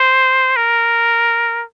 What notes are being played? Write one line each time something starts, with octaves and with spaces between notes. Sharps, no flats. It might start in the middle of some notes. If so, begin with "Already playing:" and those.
Already playing: C5
A#4